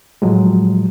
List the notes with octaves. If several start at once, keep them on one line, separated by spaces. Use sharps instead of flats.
A2 F3 F#3 G#3